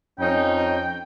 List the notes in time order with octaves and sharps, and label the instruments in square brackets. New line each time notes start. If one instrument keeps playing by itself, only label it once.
[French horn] F2 [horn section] C#4 D#4 [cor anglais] G5